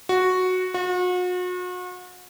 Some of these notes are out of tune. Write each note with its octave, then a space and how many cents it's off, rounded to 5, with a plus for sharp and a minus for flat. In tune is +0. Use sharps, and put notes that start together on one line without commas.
F#4 -5
F#4 -40